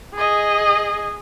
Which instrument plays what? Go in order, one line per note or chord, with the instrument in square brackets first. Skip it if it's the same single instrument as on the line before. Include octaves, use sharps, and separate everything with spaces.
[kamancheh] G#4 D#5